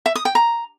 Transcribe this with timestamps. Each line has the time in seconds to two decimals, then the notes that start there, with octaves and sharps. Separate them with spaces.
0.06 E5
0.15 D#6
0.25 G5
0.35 A#5